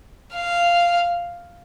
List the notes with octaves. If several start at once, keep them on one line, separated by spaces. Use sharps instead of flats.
F5